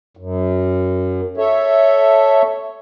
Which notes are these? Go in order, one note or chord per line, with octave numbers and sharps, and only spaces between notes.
F#2
A4 C#5 E5